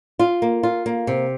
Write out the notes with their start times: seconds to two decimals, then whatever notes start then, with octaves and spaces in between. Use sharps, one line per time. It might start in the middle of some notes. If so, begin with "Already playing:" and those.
0.19 F4
0.42 A#3
0.63 F4
0.86 A#3
1.07 C3